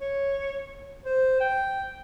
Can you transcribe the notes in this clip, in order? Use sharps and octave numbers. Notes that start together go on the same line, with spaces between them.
C#5
C5
G5